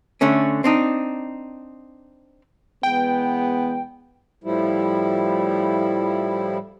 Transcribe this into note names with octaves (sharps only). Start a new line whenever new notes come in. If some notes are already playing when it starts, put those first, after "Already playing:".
D3 A3 C#4
C4 D4 D#4
E2 G#3 B3 G5
A2 F3 G3 E4